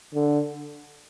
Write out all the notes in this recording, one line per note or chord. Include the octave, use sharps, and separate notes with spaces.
D3